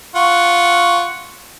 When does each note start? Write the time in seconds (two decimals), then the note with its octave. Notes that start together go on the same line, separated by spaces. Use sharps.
0.16 F4 F#5 C#6